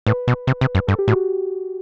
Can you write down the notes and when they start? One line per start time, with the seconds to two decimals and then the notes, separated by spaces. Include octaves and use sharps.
0.07 A2 B4
0.28 B2
0.47 C3
0.61 C3
0.75 F#2
0.87 G2 A4
0.99 G4
1.08 A2 F#4